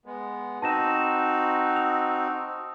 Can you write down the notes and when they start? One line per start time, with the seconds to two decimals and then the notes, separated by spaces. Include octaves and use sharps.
0.06 G#3 B3
0.62 C4 D#4 F#4 A5 A#6 E7
1.75 D#6 E6 F7